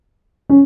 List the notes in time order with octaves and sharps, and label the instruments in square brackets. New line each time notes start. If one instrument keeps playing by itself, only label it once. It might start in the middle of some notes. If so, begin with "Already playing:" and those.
[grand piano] C#4